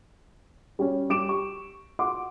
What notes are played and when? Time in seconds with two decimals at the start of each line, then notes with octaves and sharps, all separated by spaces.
0.79 G3 C#4
1.10 G3 D6 D7 E7
1.29 C#6
1.99 F#5 C6 D6